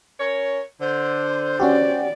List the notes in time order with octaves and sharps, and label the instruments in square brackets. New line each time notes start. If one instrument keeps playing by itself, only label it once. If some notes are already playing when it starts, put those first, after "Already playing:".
[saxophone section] C#4 A#4 C#5
[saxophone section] D3 [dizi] C5
[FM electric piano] C#4 F#4 G4 [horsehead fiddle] D5